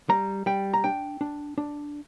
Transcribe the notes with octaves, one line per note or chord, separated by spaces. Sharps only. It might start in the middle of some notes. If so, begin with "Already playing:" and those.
G3 A#5
G3 G5
A#5
D4 G5
D4
D4